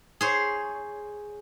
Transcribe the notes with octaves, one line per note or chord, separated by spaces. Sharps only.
G#4 C5 C#5